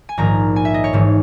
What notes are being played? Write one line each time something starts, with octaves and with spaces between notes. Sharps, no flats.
G#5
A#1 G#2 D#3 A#5
G#5
E5
D#5
C#5
G#1 G#2 E3